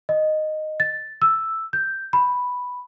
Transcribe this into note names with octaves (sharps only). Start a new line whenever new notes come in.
D#5
A6
E6
G6
B5